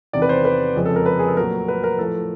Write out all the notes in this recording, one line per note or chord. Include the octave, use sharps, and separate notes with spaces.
E2 C3 D#3 D5
B4
C5
B4
F2 C#3 F3 G#3
A4
A#4
B4
G#4
A4
A#2 F#3 A3 A#4
B4
A#4
A2 F3 A3 A4